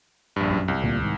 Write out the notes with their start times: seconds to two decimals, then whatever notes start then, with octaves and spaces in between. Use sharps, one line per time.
0.36 A#1 G2
0.50 F#2
0.68 C2
0.82 D2 A#2
1.03 G#2 D#3